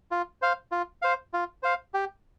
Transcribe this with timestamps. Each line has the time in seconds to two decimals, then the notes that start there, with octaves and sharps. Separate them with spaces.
0.11 F4
0.42 C5 F5
0.72 F4
1.02 C5 F5
1.34 F4
1.63 C5 F5
1.94 G4